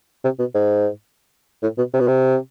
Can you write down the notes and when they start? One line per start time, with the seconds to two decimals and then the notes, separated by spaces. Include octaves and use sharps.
0.24 C3
0.39 B2
0.54 G#2
1.62 A2
1.77 B2
1.93 C3
2.00 B2
2.07 C3